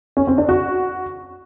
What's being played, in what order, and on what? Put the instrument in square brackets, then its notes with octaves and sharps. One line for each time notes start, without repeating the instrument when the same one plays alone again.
[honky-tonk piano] C#4
C4
D4
F#4